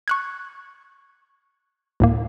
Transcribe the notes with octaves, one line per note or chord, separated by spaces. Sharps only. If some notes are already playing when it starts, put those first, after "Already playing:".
C#6 F#6 G#6
D2 A2 A#3